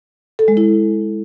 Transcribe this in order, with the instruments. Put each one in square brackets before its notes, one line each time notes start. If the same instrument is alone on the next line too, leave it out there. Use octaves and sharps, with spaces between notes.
[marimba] A4
G#3
E4